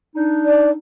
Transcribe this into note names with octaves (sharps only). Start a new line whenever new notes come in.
D4 D#4
D5